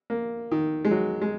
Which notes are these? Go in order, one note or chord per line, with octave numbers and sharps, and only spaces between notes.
A#3
D#3
G#3
F#3
G#3